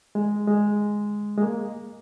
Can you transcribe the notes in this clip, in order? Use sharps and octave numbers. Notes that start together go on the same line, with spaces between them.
G#3
G#3
G#3
A#3